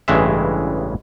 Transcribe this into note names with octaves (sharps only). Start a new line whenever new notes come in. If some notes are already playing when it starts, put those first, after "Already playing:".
A1 G2 C#3 E3 G#3 E5